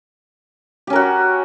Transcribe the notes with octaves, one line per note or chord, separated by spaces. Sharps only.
C#4 F#4 G4 A#4